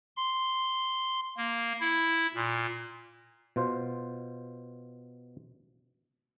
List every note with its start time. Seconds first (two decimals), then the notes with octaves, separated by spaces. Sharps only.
0.17 C6
1.37 A#3
1.81 E4
2.35 A#2
3.56 B2 F4 C5